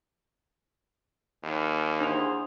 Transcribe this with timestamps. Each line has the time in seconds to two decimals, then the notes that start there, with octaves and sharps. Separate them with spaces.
1.43 D#2
2.00 E2 D4 G#4 C5 F7